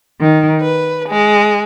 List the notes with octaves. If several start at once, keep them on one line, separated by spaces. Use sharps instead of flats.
D#3
B4
G#3